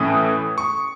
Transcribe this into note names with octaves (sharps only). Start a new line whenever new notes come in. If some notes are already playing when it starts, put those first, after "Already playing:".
Already playing: A2 E3 A3 C#4 E4 D#6
C#6